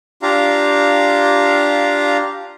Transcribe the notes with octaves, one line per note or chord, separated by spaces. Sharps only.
D4 F4 G4 F5 A#5